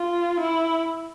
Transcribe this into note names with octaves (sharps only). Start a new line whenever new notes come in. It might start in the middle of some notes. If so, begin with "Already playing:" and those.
Already playing: F4
E4